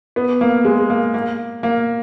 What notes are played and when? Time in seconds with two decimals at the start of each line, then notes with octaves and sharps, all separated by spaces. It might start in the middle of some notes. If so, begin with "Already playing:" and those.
0.16 B3
0.41 A#3
0.65 G#3
0.90 A#3
1.14 A#3
1.63 A#3